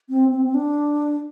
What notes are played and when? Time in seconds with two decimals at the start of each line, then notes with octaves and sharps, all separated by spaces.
0.10 C4
0.31 C4
0.45 C4
0.54 D4